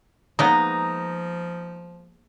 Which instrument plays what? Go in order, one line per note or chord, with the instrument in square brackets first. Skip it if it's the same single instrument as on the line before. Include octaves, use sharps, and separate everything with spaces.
[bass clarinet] F3 [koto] G#3 A#3 B3 [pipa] D#4 [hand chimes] D#6 A#6